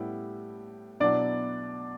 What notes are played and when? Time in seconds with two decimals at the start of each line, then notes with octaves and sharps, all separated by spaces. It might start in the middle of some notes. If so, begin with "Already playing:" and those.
Already playing: A2 G3 B3 E4 G4
1.00 B2 F#3 B3 D4 E4 D5